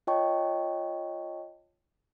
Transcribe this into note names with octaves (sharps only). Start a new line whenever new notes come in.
F4 C#5 D#5 G5 A5 C#6